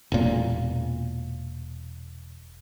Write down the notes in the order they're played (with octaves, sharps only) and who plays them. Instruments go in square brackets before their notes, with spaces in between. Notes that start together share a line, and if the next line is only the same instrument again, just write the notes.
[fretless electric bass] E1 A#2